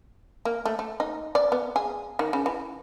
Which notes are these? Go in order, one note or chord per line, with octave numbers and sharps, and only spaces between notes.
A#3
A3
A3
D#4
D5
B3
G#4
D#3
C#3
E3